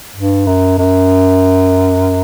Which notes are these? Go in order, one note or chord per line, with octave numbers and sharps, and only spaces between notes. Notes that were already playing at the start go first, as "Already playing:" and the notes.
G2
F#2
F#2